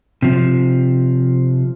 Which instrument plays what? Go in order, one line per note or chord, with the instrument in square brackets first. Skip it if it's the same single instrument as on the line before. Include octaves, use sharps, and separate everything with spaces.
[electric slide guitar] C3 F3